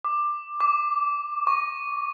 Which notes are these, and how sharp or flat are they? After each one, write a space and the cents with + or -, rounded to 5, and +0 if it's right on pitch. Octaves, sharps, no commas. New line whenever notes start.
D6 +15
D6 -15
C#6 -10